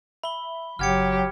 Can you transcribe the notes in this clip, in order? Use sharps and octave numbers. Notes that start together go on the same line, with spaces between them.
E5 B5 G7
G1 C#3 F#3 G4 F#5 F6 G#6 C#7